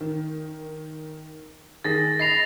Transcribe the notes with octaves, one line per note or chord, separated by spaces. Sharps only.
D#3
D#3 G#4 A6 A#6
D#5 B5 A#6 C7 F7